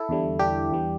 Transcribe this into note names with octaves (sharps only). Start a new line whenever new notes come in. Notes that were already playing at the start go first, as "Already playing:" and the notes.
Already playing: E4 A4
E2 D3 G3
D4 G4
E2 E3 G3